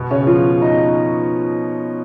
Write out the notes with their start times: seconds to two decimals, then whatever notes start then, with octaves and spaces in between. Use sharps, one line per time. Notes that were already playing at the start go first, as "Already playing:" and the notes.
Already playing: B2 B3
0.11 C#3 C#4
0.27 F3 F4
0.62 D#4 D#5